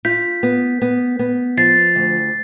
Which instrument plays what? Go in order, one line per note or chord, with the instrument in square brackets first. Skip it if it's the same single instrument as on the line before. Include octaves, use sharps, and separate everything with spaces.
[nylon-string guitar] F4 [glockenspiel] G6 B6
[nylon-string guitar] B3
B3
B3
[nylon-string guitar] F3 [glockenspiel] A6 C7
[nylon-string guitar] D2